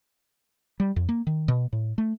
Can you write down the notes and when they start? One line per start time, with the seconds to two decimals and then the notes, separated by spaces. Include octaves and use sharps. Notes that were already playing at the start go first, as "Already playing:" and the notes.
0.80 G3
0.96 F2
1.09 A#3
1.27 D#3
1.48 B2
1.73 A2
1.98 A3